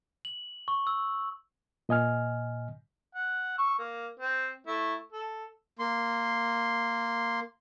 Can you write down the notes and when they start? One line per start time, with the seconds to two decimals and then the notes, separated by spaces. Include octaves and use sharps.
0.25 F#7
0.68 C#6
0.87 E6
1.89 A#2 D#5 G#5 F6
3.15 F#5
3.58 C#6 E6
3.79 A#3
4.20 C4
4.67 A3 E4
5.12 A4
5.79 A#3 C6